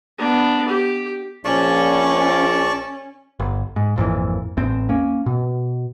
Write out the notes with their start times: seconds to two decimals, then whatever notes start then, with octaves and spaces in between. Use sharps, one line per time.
0.18 B3 D4
0.68 G4
1.45 A#1 C#4 D5 A5 C#6
3.40 G1
3.76 G#2
3.96 G#1 F2 A#2 E3
4.57 A1 E2 C4
4.89 A#3 C#4
5.26 B2